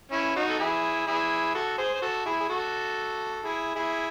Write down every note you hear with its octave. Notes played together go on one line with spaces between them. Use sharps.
C#4 E4
D#4 F#4
A4
E4 G#4
E4 G#4
F#4 A4
G#4 C5
C5
F#4 A4
E4 G#4
G#4
F#4 A4
E4 G#4
E4 G#4